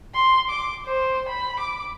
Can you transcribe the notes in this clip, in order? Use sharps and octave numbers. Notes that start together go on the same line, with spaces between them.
C6
D6
C5
B5
D6